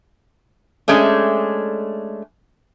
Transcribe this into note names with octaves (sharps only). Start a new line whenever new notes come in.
G#3 A3 C#4 D4